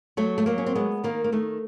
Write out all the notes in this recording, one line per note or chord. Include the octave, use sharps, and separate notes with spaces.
F#3 A3
A3
F#3 A#3
C#4
C4
G#3 B3
D#3 A#3
A#3
D#3 A3